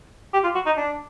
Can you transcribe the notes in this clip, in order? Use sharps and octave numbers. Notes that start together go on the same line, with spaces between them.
G4
F4
F#4
D#4
D4